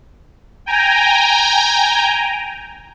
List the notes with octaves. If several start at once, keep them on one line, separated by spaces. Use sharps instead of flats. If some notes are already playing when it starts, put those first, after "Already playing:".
G5 G#5 A#5